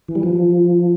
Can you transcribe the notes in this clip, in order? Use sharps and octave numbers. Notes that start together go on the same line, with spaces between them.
E3
G3
F3